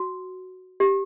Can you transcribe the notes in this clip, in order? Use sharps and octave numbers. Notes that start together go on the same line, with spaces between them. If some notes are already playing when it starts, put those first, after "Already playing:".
Already playing: F#4
G4